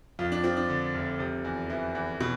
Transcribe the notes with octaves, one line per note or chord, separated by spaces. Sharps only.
F2 F4
D4
F3 C4
D4
D3
F1
C3
E2
E3 E4
E2
B2